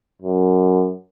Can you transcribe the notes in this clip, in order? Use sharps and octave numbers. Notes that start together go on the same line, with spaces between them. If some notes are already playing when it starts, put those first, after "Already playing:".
F#2